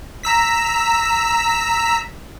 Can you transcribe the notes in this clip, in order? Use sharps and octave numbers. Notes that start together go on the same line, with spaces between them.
A#5 E6 B6